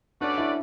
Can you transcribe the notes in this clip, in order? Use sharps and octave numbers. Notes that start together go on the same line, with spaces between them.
A3 C#4 D4 F#4 B4 D5
E4